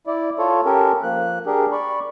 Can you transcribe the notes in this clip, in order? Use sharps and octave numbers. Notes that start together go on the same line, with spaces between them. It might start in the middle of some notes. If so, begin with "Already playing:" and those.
E4 D5
F4 A4 C#5
C#4 G4 A4 A#4
F3 A#3 F#6
D4 G4 G#4 A#4
D5 B5 C#6